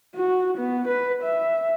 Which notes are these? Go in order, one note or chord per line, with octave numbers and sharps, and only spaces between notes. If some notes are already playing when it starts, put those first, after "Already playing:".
F#4
B3
B4
E5